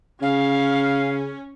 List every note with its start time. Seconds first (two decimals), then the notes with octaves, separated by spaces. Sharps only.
0.22 C#3 C#4 F5